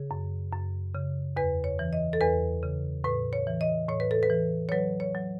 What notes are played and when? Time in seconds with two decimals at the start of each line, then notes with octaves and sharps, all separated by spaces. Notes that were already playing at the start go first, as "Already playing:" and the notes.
Already playing: C#3 G#4
0.11 F#2
0.52 F#2
0.95 C#3
1.36 E2 B4
1.64 C#5
1.79 E3
1.93 D#5
2.13 A4
2.21 E2 B4
2.63 C#3
3.04 A2 B4
3.33 C#5
3.47 E3
3.61 D#5
3.89 A2 C#5
4.00 B4
4.11 A4
4.23 B4
4.30 E3
4.69 C#5
4.72 F#3 B4
5.00 C#5
5.15 F#3